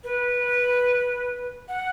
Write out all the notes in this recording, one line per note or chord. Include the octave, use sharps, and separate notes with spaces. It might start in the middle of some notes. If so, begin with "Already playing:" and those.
B4
F#5